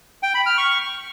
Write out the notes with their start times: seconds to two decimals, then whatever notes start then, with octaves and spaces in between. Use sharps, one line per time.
0.23 G5
0.34 B5
0.46 F6
0.58 C#6